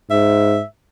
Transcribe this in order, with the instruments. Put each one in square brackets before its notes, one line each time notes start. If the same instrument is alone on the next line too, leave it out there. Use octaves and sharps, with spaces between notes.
[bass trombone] G#2 [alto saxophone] E5